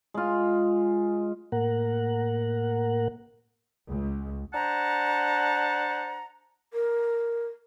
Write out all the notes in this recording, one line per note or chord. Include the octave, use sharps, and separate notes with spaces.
G#3 F4
A2 A#3 A#4 F#5
C#2
D4 C5 F#5 A5 A#5
A#4